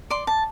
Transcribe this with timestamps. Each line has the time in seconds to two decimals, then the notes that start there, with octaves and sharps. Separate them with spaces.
0.10 D5 C6
0.27 A5